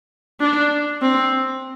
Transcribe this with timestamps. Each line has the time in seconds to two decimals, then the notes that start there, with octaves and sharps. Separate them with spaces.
0.40 D4
1.02 C4